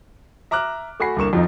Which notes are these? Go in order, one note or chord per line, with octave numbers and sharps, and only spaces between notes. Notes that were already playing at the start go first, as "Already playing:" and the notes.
E5 A#5 D6 F6 F#6
A3 F#4 G#5 B5 C7
C2 D3 A#3 C#6 E7
F2 F3 D#4